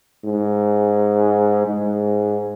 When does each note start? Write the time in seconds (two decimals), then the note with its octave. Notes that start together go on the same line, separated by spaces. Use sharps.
0.25 G#2
1.66 G#2